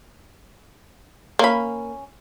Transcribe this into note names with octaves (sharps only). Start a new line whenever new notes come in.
A#3 C#4 B5